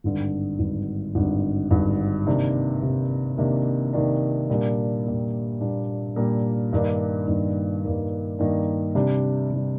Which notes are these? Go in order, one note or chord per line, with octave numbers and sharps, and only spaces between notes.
G#1 G2 D3
G#1 G2 D3
G#1 G2 D3
G#1 G2 D3
C3 D#3 A#3 D4
C3 D#3 A#3 D4
C3 D#3 A#3 D4
C3 D#3 A#3 D4
A#2 G3 A#3 D4
A#2 G3 A#3 D4
A#2 G3 A#3 D4
A#2 G3 A#3 D4
G2 D#3 A#3 D4
G2 D#3 A#3 D4
G2 D#3 A#3 D4
G2 D#3 A#3 D4
C3 G3 D4
C3 G3 D4